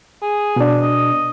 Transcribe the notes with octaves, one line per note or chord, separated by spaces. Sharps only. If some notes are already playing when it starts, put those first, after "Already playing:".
G#4
B2 D4
D#5